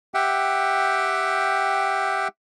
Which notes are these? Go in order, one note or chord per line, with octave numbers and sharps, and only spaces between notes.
G4 E5 F#5 G5